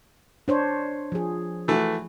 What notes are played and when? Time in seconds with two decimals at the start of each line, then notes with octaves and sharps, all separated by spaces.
0.48 D4 C5 C#5
1.12 F3 G#4
1.68 E3 A3 F#4